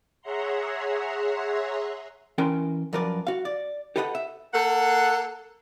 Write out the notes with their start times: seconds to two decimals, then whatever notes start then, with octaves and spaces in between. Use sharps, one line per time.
0.21 G#4 C#5 E5 F#5 A#5 C6
2.38 E3 C#4 A#4 G5 C6
2.93 F#2 F3 A#4 B4 D5
3.27 F#4 F5
3.45 D5
3.96 G4 A4 B4 D#5 F5 F#5
4.15 E5
4.54 A#3 A4 F#5